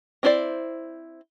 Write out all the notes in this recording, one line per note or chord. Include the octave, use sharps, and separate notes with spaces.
C4 D4 E4 C5 D5